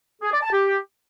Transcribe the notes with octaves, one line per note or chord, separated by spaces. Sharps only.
G#4
D5
A5
G4